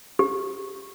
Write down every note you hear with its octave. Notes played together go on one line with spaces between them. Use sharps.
G4